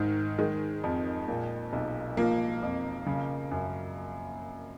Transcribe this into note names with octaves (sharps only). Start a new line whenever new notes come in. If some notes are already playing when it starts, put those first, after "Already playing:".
Already playing: G#2 D#3
D#3 G#3
F2
A#2
B1
F3 A#3
F2
C#3
F#2